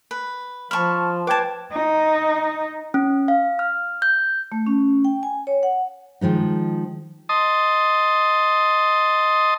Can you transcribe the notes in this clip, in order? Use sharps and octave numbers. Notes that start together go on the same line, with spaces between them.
B4
F3 A5 B5 C#6 F6
B4 G5 A5 D6 G#6
D#4
C#4
F5
F6
G6
A3
C#4
G5
G#5
C#5
F#5
D#3 F3 G#3 D#4
D#5 A5 C6 D#6